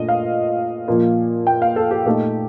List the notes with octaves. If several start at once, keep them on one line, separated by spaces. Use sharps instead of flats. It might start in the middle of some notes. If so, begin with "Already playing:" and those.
Already playing: A#2 A3 D4 F4 D#5
F5
A#2 F3 A#3 F4
G5
F5
A4
G4
A#2 A3 D#4 G4